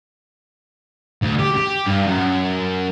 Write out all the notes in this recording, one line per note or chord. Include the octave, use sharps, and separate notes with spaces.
D2
G4
G4
G2
F#2